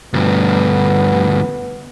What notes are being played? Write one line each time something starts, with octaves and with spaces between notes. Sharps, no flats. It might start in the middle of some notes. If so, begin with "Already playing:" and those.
D2 G2 B3